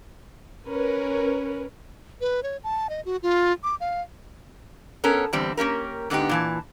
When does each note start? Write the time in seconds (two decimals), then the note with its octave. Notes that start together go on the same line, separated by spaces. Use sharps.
0.67 C#4 A#4 B4
2.21 B4
2.43 C#5
2.64 A5
2.90 D#5
3.05 F#4
3.23 F4
3.64 D6
3.80 F5
5.04 B3 C#4 A4 A#4
5.33 E2 D3 G3 C4
5.57 A#3 C#4 G4 A#4
6.10 G#2 D3 B3 D#4 G4
6.29 A#2 E3 A5